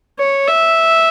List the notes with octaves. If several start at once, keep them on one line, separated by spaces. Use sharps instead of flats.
C#5
E5